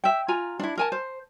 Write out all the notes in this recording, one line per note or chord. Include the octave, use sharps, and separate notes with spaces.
E5 G5
F4 G#5 A#5
D4 E4
A#4 G#5 A5
C5